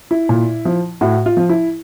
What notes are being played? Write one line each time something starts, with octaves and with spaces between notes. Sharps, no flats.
E4
A#2
F3
A2 F#4
F4
F3
E4